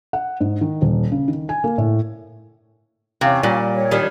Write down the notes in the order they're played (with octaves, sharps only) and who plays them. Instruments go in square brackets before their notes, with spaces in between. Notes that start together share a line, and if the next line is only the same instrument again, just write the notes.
[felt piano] F#5
G#2
D#3
D#1
C#3
D#3
G#5
A#3
A2
[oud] E2 [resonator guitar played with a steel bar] C3 [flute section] C#4 F5
[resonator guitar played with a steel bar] A#2 [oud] G3
[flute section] C#5
[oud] D#3 G3 D4